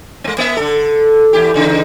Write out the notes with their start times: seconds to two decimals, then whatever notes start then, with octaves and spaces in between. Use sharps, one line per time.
0.24 G#3 B3
0.38 A#3 E5
0.57 D3 A4
1.33 E2 E4 G4
1.54 E2 C#3 D#4